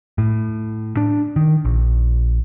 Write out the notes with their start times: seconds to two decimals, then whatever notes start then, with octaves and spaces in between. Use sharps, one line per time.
0.18 A2
0.97 D4
1.36 D#3
1.65 A#1